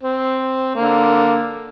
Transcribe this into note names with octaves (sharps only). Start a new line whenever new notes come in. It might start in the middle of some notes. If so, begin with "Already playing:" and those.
C4
D3 A#3